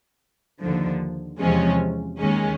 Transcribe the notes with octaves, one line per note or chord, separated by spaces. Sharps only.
D#2 D3 F3
E2 C3 F3 G#3 C#4
D#2 D#3 G#3 C#4